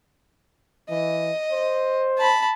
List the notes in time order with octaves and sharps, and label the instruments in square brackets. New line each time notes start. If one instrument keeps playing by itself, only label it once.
[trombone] E3 [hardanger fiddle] D#5
[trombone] C5
[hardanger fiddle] A5 B5